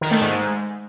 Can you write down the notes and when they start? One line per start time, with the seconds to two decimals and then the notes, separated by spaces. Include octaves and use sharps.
0.01 D#3
0.11 A3
0.21 G#2